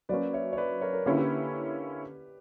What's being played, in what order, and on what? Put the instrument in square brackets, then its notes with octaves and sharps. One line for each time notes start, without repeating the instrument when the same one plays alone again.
[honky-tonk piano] F#3 A#3 C#4 [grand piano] B4 D5
[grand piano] C#5 E5
C#5
B4 D5
A#4 C#5
A#4
[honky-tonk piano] D3 A#3 C#4 E4 [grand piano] G4 B4
[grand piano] G4 B4